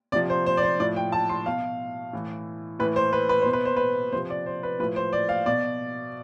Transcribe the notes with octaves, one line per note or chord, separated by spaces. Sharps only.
C3 F3 D5
C5
C5
D5
C5
A2 F3 D5
G5
A5
C6
B2 F5
A2 E3
A2 E3 B4
C5
B4
B4
B2 C5
B4
C5
B4
C3 F3 C5
D5
C5
B4
A2 F3 B4
C5
D5
F5
B2 D5